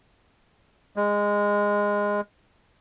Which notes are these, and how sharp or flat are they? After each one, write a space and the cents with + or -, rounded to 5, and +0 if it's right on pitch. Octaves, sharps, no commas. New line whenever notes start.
G#3 -15